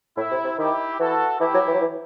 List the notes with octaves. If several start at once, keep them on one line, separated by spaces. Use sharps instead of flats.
A2 E4
C3
C3
D#3 E4 G4
E3 F#4 A4
E3 E4 G4
F#3
E3
F#3
E3